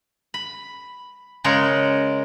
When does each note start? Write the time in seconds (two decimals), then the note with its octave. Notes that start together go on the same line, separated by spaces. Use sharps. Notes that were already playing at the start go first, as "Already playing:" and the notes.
0.34 B5
1.44 C#3 G#3 A#4 C#5